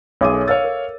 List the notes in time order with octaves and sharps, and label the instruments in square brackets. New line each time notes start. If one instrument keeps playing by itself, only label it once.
[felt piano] B1 G#4 D#7 [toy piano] C#5 E5 D6
[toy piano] A4
[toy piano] A#4 E6 [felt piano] C#5 F5 A6
[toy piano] A#4